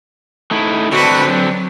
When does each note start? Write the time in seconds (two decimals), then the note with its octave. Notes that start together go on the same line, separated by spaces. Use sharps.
0.51 A3 D#4 E4
0.92 D3 C4 D4 F#4 B4
1.25 F#3